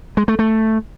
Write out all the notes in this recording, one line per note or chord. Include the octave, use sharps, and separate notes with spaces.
G#3
A3
A3